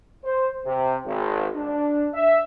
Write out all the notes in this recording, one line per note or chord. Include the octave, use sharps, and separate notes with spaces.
C5
C3
G#1
D4
E5